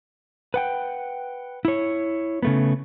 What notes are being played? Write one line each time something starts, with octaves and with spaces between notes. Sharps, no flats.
B4 F#5 G5
E4 C#5
C#3 A3 B3